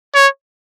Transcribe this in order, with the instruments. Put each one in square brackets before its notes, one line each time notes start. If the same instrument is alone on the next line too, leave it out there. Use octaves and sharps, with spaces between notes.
[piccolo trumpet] C#5